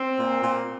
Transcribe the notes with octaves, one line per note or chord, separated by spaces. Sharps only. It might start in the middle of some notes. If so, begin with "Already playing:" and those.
Already playing: C4
A#2
A#2